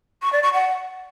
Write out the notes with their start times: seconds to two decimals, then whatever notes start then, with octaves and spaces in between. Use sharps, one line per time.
0.22 C#6
0.33 D5
0.43 C#6
0.53 F#5